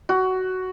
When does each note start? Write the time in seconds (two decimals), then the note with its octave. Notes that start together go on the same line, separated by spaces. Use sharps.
0.09 F#4